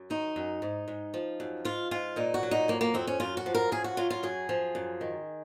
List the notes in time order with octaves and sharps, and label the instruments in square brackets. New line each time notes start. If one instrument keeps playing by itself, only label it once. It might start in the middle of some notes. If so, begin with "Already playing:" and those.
Already playing: [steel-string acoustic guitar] F#2
D#3 D#4
F#2
G#2
G#2
F3
F#2
G#2 F4
G#2 F4
A#2 D#4
F#4
F#3
D#4
F2 A#3
A#3
F2 C4
C#4
F#2 F4
F#4
F3
A#4
F#2 G#4
F#4
F#3 F4
F4
F#2 G#4
F3
F#2
D#3